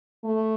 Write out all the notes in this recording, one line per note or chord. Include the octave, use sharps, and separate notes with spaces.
A3